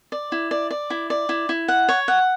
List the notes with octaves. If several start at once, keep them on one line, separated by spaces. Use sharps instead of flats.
D5
E4
D5
D5
E4
D5
E4
E4
F#5
C#5
F#5